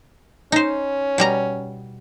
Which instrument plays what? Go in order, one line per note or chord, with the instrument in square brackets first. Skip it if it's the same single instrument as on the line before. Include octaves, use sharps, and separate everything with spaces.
[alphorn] C#4 [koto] D#4 C5
[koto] B2 G3 A#5